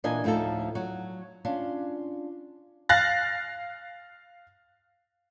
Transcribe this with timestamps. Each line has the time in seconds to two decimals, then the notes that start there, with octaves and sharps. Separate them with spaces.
0.04 A#2 E3 D4 D#5 G#5
0.24 D2 A2 F3 D#4 A4
0.75 F#3 F#4
1.45 C#4 D4 F4
2.89 F5 F#6 A6 A#6